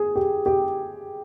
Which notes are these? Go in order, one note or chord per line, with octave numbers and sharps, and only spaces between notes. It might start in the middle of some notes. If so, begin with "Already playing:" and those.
Already playing: G#4
G4
G4